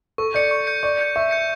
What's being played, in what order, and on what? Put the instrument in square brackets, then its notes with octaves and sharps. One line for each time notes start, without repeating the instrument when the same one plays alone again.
[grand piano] A4 [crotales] C#6
[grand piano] D5 [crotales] G6 C#7
[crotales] C#6
G6 C#7
[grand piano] D5 [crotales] C#6
[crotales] G6 C#7
[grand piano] E5 [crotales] C#6
[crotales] G6 C#7